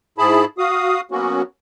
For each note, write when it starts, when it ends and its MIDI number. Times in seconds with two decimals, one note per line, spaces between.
0.18 0.45 44
0.18 0.45 64
0.18 0.45 68
0.18 0.45 81
0.18 0.45 83
0.58 1.01 66
0.58 1.01 77
0.58 1.01 87
1.11 1.42 54
1.11 1.42 58
1.11 1.42 59
1.11 1.42 61
1.11 1.42 66